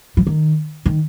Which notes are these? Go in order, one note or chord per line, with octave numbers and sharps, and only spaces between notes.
F3
D#3
D#3